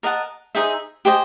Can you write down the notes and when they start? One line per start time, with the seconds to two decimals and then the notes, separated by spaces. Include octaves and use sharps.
0.03 A#4 D#5 F#5 A5
0.55 D#4 G#4 C5 E5
1.05 G4 C5 D#5 G#5